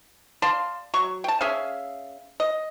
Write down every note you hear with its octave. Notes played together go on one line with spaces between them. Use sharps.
D5 F5 A5 C6
F#3 C#6
G5 A5
C#4 G#4 E5 F5
D#5